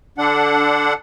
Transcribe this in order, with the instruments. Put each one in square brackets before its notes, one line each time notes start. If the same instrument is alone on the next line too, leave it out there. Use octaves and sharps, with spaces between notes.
[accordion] D3 D4 F#5